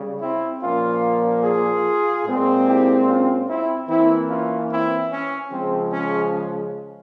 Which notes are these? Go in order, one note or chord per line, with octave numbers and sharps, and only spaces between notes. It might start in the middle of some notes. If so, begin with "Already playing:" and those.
Already playing: C#3 G3
C4 E4
A#2 F3 A#3 C#4 F4
F4 G#4
A#2 G#3 C4
E4 G4
C#4 F4
C4 E4
E3 A#3 C4 E4
C#4 F4
C4 E4
C#4
C#3 F3 G#3 C4
C#4